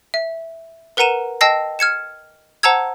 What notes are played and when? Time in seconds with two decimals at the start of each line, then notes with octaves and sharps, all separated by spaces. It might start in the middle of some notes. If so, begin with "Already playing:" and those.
0.14 E5
0.97 A#4 B4 F#5 A#5 D#7 E7
1.41 D#5 G5 A5 E6 A#6 C7
1.79 F6 G#6 C#7 E7
2.63 C5 F#5 A5 A#5 E6 G#6